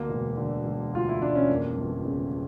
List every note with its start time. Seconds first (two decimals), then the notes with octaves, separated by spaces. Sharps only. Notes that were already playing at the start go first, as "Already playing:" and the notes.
Already playing: D2 A#3
0.10 E1
0.37 D3
0.65 E1
0.93 D2 F4
1.09 E4
1.21 E1 D4
1.35 C#4
1.49 F2 A#3
1.77 G1
2.05 C#3